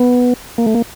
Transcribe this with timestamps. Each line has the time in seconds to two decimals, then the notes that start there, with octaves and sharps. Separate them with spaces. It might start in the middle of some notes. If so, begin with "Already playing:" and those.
Already playing: B3
0.58 A#3
0.66 A3
0.75 A#3